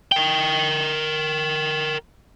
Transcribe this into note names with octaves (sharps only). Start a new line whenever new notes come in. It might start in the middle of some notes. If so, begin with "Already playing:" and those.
A#4 G5